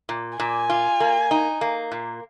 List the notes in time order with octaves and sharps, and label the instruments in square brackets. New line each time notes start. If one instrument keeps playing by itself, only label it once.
[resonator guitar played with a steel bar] A#2
[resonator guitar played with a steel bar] A#2 [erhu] G#5
[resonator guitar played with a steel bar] F4
A#3
D#4
A#3
A#2